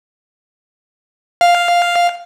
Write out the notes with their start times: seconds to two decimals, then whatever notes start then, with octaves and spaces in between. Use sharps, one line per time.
1.41 F5